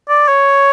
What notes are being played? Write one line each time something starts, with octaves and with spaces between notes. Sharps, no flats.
D5
C#5